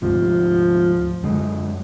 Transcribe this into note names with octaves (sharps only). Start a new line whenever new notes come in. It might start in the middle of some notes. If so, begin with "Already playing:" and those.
D2 G#2 C3 F3
F#2 D3 G#3